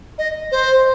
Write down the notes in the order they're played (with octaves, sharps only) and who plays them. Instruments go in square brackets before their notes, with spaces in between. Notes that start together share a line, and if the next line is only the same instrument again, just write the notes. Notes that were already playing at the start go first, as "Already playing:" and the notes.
[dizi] D#5
C5